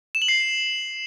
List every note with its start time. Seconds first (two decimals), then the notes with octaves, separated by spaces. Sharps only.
0.15 E7
0.22 F#7
0.28 C7